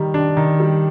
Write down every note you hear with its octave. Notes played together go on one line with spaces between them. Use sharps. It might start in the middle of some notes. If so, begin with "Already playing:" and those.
Already playing: D#3 G3
D4
D#3
G3